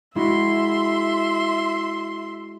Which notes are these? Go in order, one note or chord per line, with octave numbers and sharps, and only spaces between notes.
G#3 E4 F#4 E5 C6